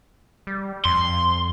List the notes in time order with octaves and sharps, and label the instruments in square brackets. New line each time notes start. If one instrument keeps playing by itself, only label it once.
[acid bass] G3
[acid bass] F2 [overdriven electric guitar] C6